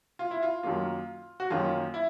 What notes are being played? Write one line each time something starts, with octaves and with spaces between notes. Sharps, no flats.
F4
E4
F4
F#2 D#3 F#3 A#3 F4
F#4
F#2 D#3 F#3 A#3 C#4 F4
E4